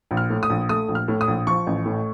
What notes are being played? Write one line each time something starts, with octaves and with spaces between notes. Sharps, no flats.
A#1
F6
A2
D#6
A#1
A3 D#6
A#1
F6
A2
D#6
A#1
F3 C#6
A1
A2